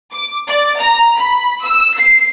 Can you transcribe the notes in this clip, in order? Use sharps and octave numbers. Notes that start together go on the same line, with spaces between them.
D6
D5
A#5
B5
E6
C7